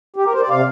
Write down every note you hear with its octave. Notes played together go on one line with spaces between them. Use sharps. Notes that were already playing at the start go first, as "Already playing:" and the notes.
G4
A#4
C5
D5
C3 F5